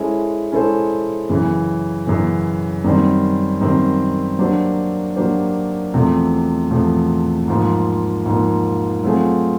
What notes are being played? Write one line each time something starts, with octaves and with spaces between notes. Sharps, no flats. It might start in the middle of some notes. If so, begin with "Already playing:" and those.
Already playing: G#3 C#4 E4 A4 C5
G#3 C#4 E4 A4 C5
F#2 C#3 E3
F#2 C#3 E3
F#2 D#3 G3 C4
F#2 D#3 G3 C4
F#3 A#3 D4 G4 C5
F#3 A#3 D4 G4 C5
E2 C3 F3 A3
E2 C3 F3 A3
G#2 F3 A#3
G#2 F3 A#3
F#3 A3 C4 F4 G#4